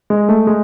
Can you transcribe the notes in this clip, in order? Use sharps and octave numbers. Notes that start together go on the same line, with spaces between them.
G#3
A3
G#3